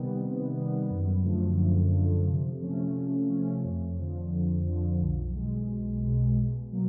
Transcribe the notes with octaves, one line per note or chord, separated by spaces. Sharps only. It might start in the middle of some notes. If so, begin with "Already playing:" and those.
Already playing: C3 D#3 G3 B3
C3
D#3 G3 B3
F#2
D3 F3 A3
F#2
D3 F3 A3
C3
F3 A3 C#4
C3
F3 A3 C#4
F2
D3 F3
F2
D3 F3
B1
B2 G#3
B1
B2 G#3
B2
F#3 A#3